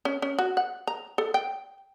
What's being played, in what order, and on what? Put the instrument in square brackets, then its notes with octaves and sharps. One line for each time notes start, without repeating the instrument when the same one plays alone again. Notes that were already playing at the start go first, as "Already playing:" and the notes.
[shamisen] C#4
C#4
F#4
F#5
A#5
A4
G5